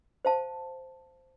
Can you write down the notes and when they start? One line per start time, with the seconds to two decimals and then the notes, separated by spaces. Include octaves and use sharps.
0.25 C5 F5 A5